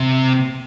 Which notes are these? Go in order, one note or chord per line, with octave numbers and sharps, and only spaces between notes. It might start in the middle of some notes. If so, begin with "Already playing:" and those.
Already playing: C3